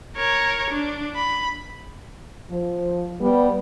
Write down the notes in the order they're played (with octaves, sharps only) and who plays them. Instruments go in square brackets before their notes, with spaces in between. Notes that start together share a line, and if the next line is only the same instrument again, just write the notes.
[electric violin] A#4 C#5
D4
B5
[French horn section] F3
G3 B3